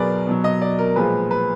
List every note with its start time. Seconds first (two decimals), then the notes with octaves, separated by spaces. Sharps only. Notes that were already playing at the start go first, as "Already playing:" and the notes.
Already playing: B2 F#3 G#4 A#4 B4 D5
0.27 B2 F#3
0.44 D#5
0.62 D5
0.79 A#4
0.96 A#2 F3 G#3 B4
1.31 B4